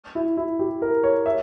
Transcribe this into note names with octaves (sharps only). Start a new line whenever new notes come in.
E4
E4
G4
A#4
C#5
E5